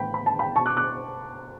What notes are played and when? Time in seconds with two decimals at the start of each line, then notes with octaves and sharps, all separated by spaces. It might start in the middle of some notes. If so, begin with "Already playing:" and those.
Already playing: A2 E3 G5 B5
0.14 B5
0.26 A5
0.39 G5 B5
0.56 B2 A5 C#6
0.66 D6 F#6
0.77 D6 F#6